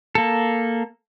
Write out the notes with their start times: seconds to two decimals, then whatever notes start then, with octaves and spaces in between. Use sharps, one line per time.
0.15 A#3 A4